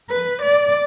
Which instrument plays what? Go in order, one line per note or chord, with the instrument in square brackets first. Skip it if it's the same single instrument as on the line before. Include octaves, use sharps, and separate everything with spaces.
[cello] B4
D5